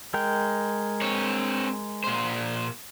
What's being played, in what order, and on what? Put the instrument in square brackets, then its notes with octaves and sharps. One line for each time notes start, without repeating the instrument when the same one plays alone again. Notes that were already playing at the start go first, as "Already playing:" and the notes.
[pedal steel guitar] G#3 A#4 G5
[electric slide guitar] C4 C#5
A#2 C5